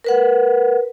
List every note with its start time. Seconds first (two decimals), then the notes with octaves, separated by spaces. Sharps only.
0.04 A#4 B4 F#5